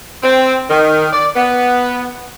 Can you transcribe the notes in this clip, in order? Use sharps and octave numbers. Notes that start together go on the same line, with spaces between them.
C4
D#3
D5
B3